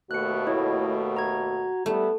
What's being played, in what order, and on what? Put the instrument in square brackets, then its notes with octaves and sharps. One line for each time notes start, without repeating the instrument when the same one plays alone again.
[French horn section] D#2 B2 A3 [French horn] F#4 [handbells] F#6 C#7
[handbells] E4 C#5 D#5
A#5 G#6
[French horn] G3 [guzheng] A3 [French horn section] B3 E4